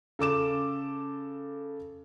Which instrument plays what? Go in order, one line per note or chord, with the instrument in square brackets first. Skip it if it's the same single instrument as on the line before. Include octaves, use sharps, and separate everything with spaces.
[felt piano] C#3 A4 D6 E7